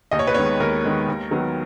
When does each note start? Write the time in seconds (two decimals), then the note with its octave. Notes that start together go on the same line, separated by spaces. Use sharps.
0.11 D#2 D#5
0.19 C#5
0.27 B4
0.34 D#3 G#3 B3 C#5
0.60 D#2 A#4
0.83 D#3 G#3 B3
1.08 D#2
1.31 D#3 F#3 B3